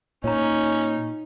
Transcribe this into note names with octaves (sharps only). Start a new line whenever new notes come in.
A#2 C#4 D#4 C#5 A#5